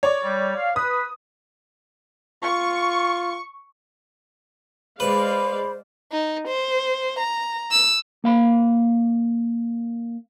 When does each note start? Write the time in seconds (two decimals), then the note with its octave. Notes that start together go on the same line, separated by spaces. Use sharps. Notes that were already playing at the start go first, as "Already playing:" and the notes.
0.03 C#5 D5
0.23 G3
0.56 F5
0.76 B4 D#6
2.44 F4 C#6
5.00 G#3 B4 C5 D5 F5 B5
6.12 D#4
6.48 C5
7.19 A#5
7.71 E6
8.24 A#3 F5 B5